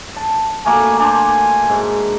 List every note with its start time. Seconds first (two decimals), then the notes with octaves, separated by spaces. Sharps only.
0.16 A5
0.66 A3 A#3 F#4 G#5
1.00 D4 C5 G#5
1.69 G#2